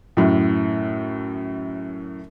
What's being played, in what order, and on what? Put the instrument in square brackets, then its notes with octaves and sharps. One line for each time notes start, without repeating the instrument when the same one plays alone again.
[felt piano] F#2 A2